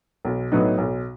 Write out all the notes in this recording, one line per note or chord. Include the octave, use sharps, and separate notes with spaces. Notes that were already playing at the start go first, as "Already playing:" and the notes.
B1
A2 F#3 B3 D#4
B1